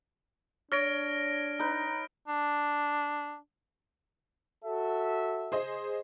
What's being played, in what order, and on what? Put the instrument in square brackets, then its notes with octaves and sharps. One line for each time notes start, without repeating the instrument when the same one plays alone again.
[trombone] D4 [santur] C#5 [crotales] F6 A#6 D7
[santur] D#4 B4
[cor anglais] D4
[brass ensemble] F#4 A4 E5
[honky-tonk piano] G#4 C5 D#5